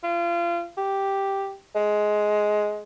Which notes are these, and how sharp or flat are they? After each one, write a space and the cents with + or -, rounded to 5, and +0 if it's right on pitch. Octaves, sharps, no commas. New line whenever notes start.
F4 -30
G4 +0
G#3 +15